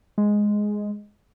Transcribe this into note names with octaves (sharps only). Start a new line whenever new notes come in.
G#3